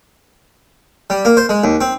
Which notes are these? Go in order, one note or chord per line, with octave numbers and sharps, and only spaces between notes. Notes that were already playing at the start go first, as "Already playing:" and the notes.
G3
A#3
C5
G#3
D#2
C4